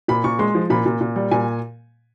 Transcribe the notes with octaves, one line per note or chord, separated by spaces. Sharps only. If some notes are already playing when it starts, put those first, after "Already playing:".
A#2 B5
A#2 C#6
G#3 C6
F3
A#2 B5
A#2
A#2
G3
A#2 G#5